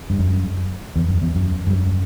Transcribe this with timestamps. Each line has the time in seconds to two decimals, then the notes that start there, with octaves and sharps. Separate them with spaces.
0.10 G2
0.19 F#2
0.96 E2
1.08 F#2
1.22 E2
1.35 F#2
1.67 G2
1.72 F#2